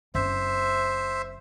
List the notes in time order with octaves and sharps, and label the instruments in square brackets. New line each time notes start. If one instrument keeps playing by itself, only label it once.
[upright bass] F#1 C4 [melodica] C5 E5